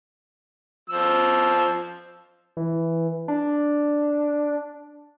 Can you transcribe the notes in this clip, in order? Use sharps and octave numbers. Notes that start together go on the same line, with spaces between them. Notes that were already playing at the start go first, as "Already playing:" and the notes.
F3 E6
E3
D4